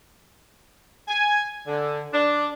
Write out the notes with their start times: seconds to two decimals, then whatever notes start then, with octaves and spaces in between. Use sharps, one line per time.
1.08 G#5
1.67 D3
2.14 D4